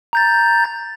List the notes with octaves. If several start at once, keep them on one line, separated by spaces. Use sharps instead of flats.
A#5 G6 A6